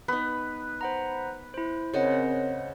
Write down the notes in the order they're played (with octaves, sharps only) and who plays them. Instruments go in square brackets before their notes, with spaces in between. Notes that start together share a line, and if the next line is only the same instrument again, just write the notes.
[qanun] B3 D#4 [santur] B4
[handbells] C5 F#5 A#5
E4 C5
[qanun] C#3 [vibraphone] C4 A#4 C#5 [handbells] C5 D#5 F#5